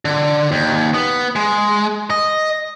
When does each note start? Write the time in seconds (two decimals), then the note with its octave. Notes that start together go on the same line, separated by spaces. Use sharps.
0.05 D3
0.52 D#2
0.94 B3
1.36 G#3
2.10 D#5